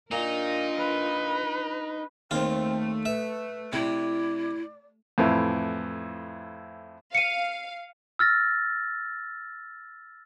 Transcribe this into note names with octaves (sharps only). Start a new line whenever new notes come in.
A#2 D4 D#4 F4 A#4
B4
D#2 A3 C4 F4
B4 E5
C3 E4 D5
F2 A2 E3
F5 C#7 D#7
E6 F6 A6 A#6